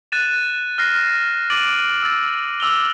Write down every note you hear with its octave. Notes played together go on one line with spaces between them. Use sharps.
F#6 A6 D#7 E7
F6 F#6 A#6 C7
D6 A6 D7 D#7 F#7
E6 A6
D6 E6 F7 G7